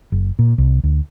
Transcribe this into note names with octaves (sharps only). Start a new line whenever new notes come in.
F#1
A#2
C2
D2